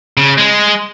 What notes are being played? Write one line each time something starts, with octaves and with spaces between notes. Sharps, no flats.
C#3
G#3